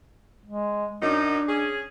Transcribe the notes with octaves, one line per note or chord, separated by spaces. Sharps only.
G#3
F#2 D4 D#4
C#4 G#4